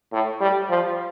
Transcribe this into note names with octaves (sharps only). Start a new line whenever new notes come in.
A2
G3
F3